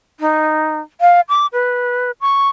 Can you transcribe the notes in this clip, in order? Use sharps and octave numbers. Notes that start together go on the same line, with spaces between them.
D#4
F5
D6
B4
C#6